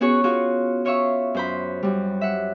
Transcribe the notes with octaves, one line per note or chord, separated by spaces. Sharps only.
B3 C#4 F#4 G#4 C#5
F4 F#4 G#4
F4 C#5 E5 F5 C#6 E6
F#2 C5 B5
F#2 G3
E5 F#5